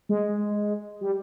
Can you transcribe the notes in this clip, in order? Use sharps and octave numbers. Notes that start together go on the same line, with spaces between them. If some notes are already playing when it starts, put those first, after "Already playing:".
G#3
G3